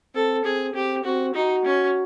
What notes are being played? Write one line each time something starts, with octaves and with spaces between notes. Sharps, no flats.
C4 A4
C4 G#4
C4 G4
C4 F#4
D#4 F#4
C#4